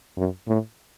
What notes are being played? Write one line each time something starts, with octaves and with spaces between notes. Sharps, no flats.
F#2
A2